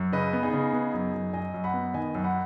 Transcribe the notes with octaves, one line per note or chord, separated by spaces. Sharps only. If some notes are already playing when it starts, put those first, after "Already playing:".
Already playing: F#2
C#3 B4 D#5
B3
D#4 G#4
C#3
B3
F#2
F#2
F#2 D#5 G#5
F#2
F#5 B5
B3
D#3 D#5 G#5
F#2
F#5 B5